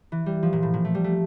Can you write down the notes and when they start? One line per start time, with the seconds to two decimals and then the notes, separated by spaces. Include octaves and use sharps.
0.12 E3
0.26 G3
0.43 F3
0.53 A#2
0.63 A2
0.74 A#2
0.85 A3
0.95 G3
1.04 A3